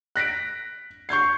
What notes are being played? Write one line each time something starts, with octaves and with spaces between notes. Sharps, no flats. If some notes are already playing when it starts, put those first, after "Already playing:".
F#6 A#6 B6 D7
C#6 G6 G#6 C7